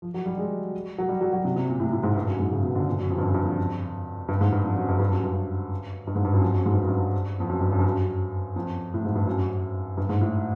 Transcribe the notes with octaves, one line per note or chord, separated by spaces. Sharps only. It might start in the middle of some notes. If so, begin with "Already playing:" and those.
F3
F#3
G3
G#3
F#3
G3
F#3
F#3
C3
C3
A#2
A2
A2
G#2
G2
F#2
G#2
C#3
B2
D3
A#2
F#2
F2
G2
F#2
G2
F2
G2
G#2
G2
F2
F#2
G2
G2
F#2
G2
G2
G#2
G2
F#2
F2
F#2
G#2
G2
F#2
G2
F2
F#2
G2
F#2
G2
F#2
F2
A2
G#2
G2
F#2
G2
G#2
A2